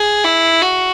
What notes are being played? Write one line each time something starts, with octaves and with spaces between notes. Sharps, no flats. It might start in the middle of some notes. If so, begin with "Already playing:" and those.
Already playing: G#4
E4
F#4